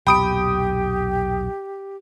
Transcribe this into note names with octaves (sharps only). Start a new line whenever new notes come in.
B1 E2 A#2 G4 G5 B5 D#6 D7